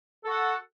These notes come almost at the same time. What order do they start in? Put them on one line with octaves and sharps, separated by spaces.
A4 F#4 F#5